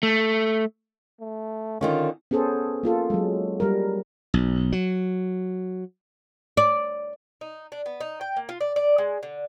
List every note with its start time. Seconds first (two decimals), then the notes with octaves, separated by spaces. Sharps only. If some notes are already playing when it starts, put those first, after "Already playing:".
0.03 A3
1.20 A3
1.81 D3 D#3 C#4 F4
2.31 B3 C#4 G#4 A4 C5
2.83 A#3 F4 A4
3.10 F#3 G#3
3.60 G3 A#4
4.34 B1
4.72 F#3
6.57 D5
7.41 D#4
7.72 D4
7.86 B3
8.01 D#4
8.21 G5
8.37 A#3
8.49 F4
8.61 D5
8.76 D5
8.98 G#3
9.23 D3